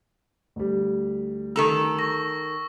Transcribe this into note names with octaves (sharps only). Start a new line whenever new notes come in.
D2 G3
D#3 A4 A#5 E6
C#6 A#6